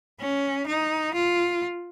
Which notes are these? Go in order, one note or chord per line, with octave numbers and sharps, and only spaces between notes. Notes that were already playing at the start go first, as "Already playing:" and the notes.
C#4
D#4
F4